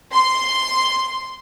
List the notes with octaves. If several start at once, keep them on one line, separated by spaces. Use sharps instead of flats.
C6